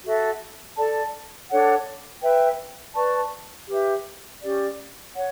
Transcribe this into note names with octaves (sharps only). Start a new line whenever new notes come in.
F#4 A4 E5
A4 D5 A5
D4 A4 C#5 F#5
B4 E5 G5
B4 D5 A5 C#6
G4 B4 E5
C#4 G4 D5
C#5 F#5